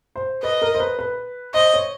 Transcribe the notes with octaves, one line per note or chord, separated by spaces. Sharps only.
C5
B4 D#5
A#4
C5
B4
B4
C5 D#5
C#5